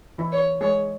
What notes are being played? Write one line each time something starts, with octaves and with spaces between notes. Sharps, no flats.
E3 E4
C#5
G#3 G#4 C#5